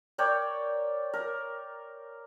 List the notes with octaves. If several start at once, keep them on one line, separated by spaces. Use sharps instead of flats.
A#4 C#5 D5 G5
A#4